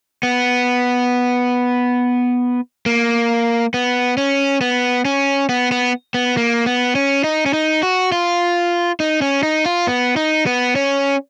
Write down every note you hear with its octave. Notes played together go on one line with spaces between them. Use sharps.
B3
A#3
B3
C#4
B3
C#4
B3
B3
B3
A#3
B3
C#4
D#4
C#4
D#4
F#4
F4
D#4
C#4
D#4
F4
B3
D#4
B3
C#4